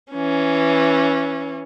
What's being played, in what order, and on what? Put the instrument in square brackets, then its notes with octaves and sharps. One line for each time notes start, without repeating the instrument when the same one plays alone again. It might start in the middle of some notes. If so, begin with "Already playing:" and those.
[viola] E3 C#4